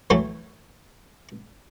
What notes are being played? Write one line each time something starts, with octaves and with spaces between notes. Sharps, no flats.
E3 F#3 A3